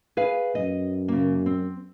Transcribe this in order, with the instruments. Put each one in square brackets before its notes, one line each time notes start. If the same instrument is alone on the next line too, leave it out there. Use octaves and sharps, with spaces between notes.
[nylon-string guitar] G#4 B4 F5
[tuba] F#2 [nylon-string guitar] D#5
[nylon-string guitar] C#3 A#3
C4